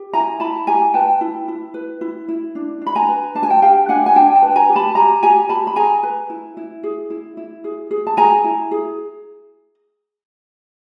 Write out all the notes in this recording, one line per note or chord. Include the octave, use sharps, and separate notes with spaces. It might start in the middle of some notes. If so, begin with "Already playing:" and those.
Already playing: G4
E4 G#5 A#5
E4 A5 B5
G4 G#5 A#5
B4 G5 A5
E4
E4
B4
E4
E4
D4
D4 B5
G#5 A#5
B4
D4 A5
G#5
G5 A5
G4 F5 G5
D4 F#5 G#5
G#5
D4 G5 A5
G5 A5
B4
G#5 A#5
G4
A5 B5
G4 G#5 A#5
G4 G#5 A#5
G4 A5 B5
B5
G#4 G#5 A#5
B4
E4
E4
G#4
E4
E4
G#4
G#4
A5
G#4 G#5 A#5
E4
G#4